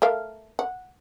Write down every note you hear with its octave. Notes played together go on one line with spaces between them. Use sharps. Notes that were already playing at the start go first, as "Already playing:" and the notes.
A3 A#4 F5
F#5